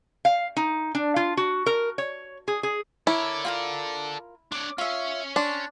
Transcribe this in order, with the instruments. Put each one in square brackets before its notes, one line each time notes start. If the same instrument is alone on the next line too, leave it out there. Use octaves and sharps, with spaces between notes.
[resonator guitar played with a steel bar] F5
D#4
D4
F4
F#4
A#4
C#5
G#4
G#4
[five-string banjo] E4 [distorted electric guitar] A4 D5 [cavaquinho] A#4 C#5
[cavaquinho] F4 G4 A#4
[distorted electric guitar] D4 C#5 [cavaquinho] D6
[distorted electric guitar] C#4 [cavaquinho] F4 E5
[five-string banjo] D4 [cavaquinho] C6